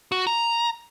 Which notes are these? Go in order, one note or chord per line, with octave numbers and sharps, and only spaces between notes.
F#4
A#5